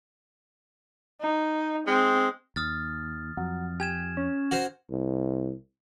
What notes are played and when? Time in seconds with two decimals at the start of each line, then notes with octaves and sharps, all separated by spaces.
1.21 D#4
1.87 G#3 C4
2.56 D#2 D#6 F6 A6
3.37 F2 F#3
3.80 G4 G#5 G#6 E7
4.17 C#4
4.51 F#4 A#4 C5
4.91 C2